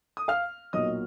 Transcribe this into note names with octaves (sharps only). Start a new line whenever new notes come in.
D#6
F5 F6
B1 A#2 F#3 D#5 D#6